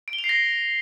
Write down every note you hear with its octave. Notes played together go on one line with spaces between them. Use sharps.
D7
G7
F7
C7
A#6